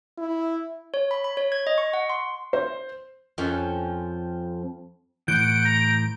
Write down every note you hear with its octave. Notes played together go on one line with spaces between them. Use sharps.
E4
C#5
B5
B5
C#5
G#6
D#5
C#6
F#5
C6
C5
F2 F3 C#4
A2 E3 F#5 G6 D7
A#5